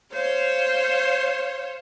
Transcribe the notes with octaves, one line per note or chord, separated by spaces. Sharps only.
C5 C#5 F5